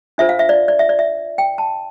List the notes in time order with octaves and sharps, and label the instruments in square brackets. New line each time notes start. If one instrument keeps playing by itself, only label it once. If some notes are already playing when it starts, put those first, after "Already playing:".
[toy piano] D4 F4 A4 C5 E5
F5
E5
D5
D5
E5
D5
E5
G5
A5